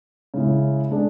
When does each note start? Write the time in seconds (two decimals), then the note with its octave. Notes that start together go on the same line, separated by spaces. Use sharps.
0.34 C#3 G#3 C#4 E4
0.91 G#3 D4 G#4 D5